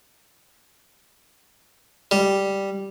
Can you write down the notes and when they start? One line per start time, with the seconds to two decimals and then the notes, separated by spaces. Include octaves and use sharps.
2.11 G3